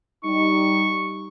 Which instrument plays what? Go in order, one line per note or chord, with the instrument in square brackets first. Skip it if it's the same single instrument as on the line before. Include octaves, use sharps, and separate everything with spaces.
[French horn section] G3 D#4 [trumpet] C#6